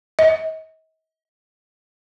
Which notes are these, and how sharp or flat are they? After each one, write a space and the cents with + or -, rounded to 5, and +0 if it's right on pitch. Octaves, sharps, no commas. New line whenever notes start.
D#5 +45